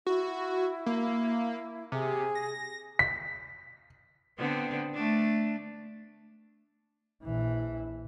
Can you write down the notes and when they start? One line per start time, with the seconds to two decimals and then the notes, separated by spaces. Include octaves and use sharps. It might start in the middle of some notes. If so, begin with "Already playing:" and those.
0.07 E4 F#4
0.86 A#3
1.92 C3 G#4
2.35 A#6
2.99 B6
4.38 D3 B3 C4
4.94 A3 D4
7.24 A#1 E3